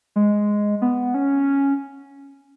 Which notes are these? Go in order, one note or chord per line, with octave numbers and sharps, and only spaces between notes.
G#3
B3
C#4